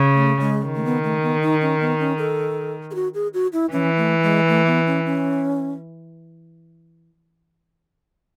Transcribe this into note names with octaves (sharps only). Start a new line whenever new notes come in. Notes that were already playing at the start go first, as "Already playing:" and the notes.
Already playing: C#3
A3
G#3
D#3
A3
B3
A3
B3
D#4
C#4
B3
C#4
A4
G#4
F#4
G#4
F#4
E4
E3 C#4
A3
G#3
A3
B3
C#4
C#4